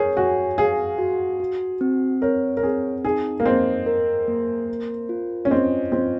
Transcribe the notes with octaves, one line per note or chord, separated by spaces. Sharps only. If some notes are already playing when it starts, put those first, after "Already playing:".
Already playing: G#4 A#4 C#5
F#4 G#5
G#4 F5
F#4
F#4
C4
A#4 C#5
A#4
C4 G#4
D#4 G#4
A#3
C4 D#5
A#4
A#3
A#4
F4
C#4
C4 D#5
C4 F4